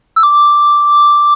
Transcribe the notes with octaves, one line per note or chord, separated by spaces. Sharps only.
E6
D6